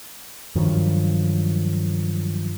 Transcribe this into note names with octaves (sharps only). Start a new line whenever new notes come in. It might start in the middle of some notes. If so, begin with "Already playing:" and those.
G2 D#3 F3 F#3